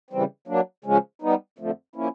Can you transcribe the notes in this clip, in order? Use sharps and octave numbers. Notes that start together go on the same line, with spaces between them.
C#3 E3 G3 C4
F#3 A#3 D4
C#3 F3 G#3 C#4
G3 B3 D#4
F2 D3 F3 A3
F3 A#3 C#4 E4